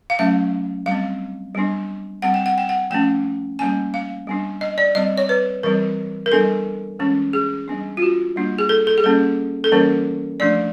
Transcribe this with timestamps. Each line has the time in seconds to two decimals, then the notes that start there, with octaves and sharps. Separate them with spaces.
0.10 F5
0.19 F#3 A3 C#4 E5
0.86 G3 F5
0.91 C4
1.55 G3 B3 D4
2.22 G3 C4 F#5
2.34 G5
2.46 F#5
2.58 G5
2.69 F#5
2.90 F3 A3 C#4 G5
3.59 G3 A#3 C#4 G#5
3.94 F5
4.27 G3 B3 D4
4.61 D#5
4.78 D5
4.95 G3 C4 D#5
5.18 C#5
5.29 B4
5.63 E3 G3 C4 A#4
6.26 A#4
6.32 G3 B3 D4 A4
6.99 E3 G#3 C#4
7.33 G#4
7.68 G3 B3 D4
7.97 F4
8.02 F#4
8.36 G3 A#3 D4
8.59 G#4
8.69 A4
8.87 A4
8.98 G#4
9.04 G3 A#3 C#4 A4
9.64 A4
9.72 E3 G3 A#3 C#4 A#4
10.40 F3 A3 D4 D5